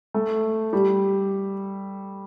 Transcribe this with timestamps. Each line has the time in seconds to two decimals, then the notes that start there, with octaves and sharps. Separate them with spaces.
0.14 A3
0.73 G3